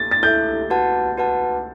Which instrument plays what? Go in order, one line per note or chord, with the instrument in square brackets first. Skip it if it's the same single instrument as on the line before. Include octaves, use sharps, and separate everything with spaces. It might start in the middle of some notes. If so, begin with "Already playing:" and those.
Already playing: [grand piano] A6
A6
[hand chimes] E4 A4 E5 [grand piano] G6
[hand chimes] F#4 B4 F#5 A5
F#4 B4 F#5 A5